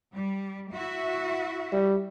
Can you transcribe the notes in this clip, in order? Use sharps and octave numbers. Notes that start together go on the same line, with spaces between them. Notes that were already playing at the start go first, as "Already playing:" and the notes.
G3
E4 F#4 E5
G3